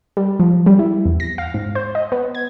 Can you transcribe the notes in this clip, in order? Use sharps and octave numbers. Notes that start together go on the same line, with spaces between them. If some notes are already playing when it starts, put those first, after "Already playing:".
G3
F3
G3
E4
E2
A#6
F5
G#2
C5
D#5
B3
G#6